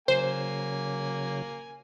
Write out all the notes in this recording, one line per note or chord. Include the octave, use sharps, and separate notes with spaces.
C#3 F#3 A#3 C5 G#5